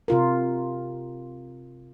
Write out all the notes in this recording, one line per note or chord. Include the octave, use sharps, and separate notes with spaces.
C3 F4 A#4